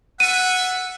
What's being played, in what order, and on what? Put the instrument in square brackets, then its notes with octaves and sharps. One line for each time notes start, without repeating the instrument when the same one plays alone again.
[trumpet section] G#4 A4 E5 [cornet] F#5 [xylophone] D#7